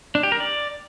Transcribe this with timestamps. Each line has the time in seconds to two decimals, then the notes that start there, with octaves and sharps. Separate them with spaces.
0.15 D4
0.23 G4
0.32 A#4
0.40 D5